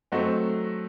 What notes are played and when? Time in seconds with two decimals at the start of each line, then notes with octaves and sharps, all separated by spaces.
0.12 F#3 A3 C4 D#4 F#4